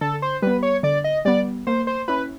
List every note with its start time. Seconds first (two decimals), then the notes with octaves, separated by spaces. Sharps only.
0.01 D3 A4
0.22 C5
0.42 G3 B3 B4
0.63 C#5
0.83 D3 D5
1.04 D#5
1.25 G3 B3 D5
1.67 A#3 C5
1.87 C5
2.08 C#4 E4 B4